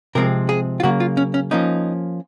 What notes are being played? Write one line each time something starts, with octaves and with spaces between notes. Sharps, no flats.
C3 F3 G#3 C4 A#4
G#4
F4
C#3 F#3 A#3 F#4
F4
C#4
C#4
F3 A#3 C#4 D#4